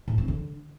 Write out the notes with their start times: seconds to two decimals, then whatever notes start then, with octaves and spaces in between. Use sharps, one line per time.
0.08 A2
0.18 C4
0.28 D3